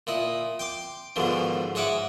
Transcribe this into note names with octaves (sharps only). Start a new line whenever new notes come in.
A#2 E4 D#5
G5 C6 D6
G#2 B2 D3 D#3 F3
G#2 C#5 D#5 E5 F#5 D6